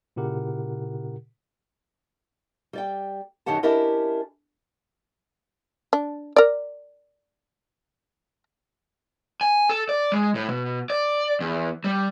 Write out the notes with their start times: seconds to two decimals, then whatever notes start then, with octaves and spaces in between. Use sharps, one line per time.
0.16 A#2 C#3 E4 G4 A#4 F#5
2.73 G3 D5 G5
3.46 F#2 D#3 C#4 G4 F#5 A5
3.63 C#4 D4 E4 G4 A#4 D#5
5.93 D4
6.36 A#4 D5
9.41 G#5
9.70 A4
9.89 D5
10.12 G#3
10.35 A2
10.49 B2
10.90 D5
11.40 E2
11.84 G3